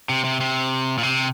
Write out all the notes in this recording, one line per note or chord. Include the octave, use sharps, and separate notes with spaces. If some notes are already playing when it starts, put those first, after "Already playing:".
C3
C3
C3
A#2
C3